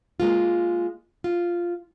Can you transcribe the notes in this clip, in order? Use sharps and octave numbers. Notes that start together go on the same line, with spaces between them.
G#3 A#3 F4
F4